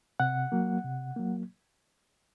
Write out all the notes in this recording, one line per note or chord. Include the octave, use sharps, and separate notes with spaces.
C3 F#5
F#3 A#3
C3
F#3 A#3